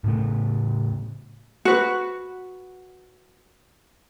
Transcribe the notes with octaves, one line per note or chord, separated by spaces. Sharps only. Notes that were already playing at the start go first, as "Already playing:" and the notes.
A2 C#3 A3
F#4 B4